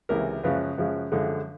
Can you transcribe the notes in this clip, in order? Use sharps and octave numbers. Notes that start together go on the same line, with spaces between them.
C#2 C3 E3 G#3 A#4
F#2 C#3 F3 G#3 B4
F#2 C#3 F3 G#3
F#2 D3 F3 G#3